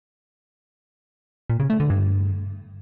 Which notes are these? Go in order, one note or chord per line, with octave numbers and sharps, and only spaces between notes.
A#2
C#3
A3
D3
G2